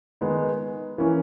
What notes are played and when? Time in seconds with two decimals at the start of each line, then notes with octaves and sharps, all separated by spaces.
0.21 D#3 G#3 B3 D#4
0.98 E3 A#3 C#4